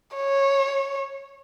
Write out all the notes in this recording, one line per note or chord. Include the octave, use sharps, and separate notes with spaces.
C#5